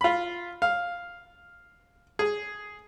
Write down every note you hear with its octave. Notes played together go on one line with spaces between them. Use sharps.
F4 B5
F5
G#4